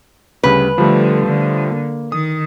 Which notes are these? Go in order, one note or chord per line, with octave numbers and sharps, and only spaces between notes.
D2 C#3 G3 B4
D3 F3 G3 A3
D3
A#3
D#3 D#6